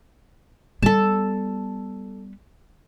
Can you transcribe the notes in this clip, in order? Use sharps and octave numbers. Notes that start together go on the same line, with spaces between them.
G3 B3 A4 A5